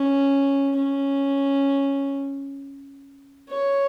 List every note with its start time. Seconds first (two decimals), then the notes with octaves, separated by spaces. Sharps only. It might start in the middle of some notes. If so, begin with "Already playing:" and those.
Already playing: C#4
0.76 C#4
3.49 C#5